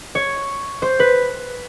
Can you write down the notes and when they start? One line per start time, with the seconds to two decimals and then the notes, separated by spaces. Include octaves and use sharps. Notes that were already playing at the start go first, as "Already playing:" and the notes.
0.15 C#5
0.82 C5
1.00 B4